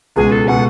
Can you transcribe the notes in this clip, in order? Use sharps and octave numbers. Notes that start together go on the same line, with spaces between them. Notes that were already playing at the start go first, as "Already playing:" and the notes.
C#2 B2 G#3 G#4
A4
B2 G#3 F#5